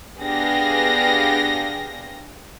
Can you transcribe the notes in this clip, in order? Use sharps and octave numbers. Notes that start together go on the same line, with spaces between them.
B3 D4 G4 G#4 F5 A#6